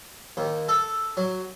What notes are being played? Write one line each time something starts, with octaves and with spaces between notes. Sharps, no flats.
D#2
A4
F#3